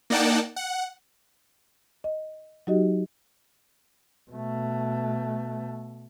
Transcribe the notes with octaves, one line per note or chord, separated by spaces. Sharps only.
A#3 D#4 D5 F#5 G5 A5
F#5
D#5
F#3 D#4 F#4 G4 D#5
B2 A3